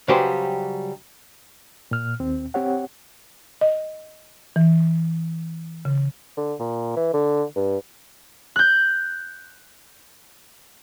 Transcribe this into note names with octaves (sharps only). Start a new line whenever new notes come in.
C#3 F#3 G3 G4 B4 C5
A#2 F6
D#2 C4
C4 G4 C#5 F#5
D#5
E3
C#3
D3
A#2
E3
D3
G2
F#6 G6